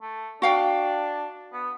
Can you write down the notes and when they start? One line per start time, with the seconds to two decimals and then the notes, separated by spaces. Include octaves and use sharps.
0.02 A3
0.42 D4 F#4 F5 G5
1.53 B3